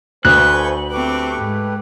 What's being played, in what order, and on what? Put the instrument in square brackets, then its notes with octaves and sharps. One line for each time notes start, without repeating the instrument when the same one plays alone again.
[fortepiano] D2 [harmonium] A3 C5 G#5 [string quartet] B4 C#6 G6 [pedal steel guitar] F#6
[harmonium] A3 G4 B4 [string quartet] C4 C#6 D6
[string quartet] G#2